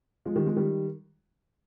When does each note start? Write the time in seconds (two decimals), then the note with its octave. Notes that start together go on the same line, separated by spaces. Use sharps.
0.25 F3 G#3
0.35 D#3 G3
0.46 F3 G#3
0.56 D#3 G3